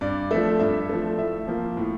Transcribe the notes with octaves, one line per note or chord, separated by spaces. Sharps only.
G2 D5
F3 A3 E5
G2 E5
F3 A3
A2 E5
F3 A#3
A2